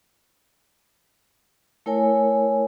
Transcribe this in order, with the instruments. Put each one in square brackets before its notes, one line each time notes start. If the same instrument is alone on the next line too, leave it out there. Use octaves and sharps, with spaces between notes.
[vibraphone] A3 E4 A#4 C#5 G#5